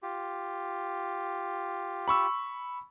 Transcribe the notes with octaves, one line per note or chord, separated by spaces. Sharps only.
F4 G4
B5 C#6 E6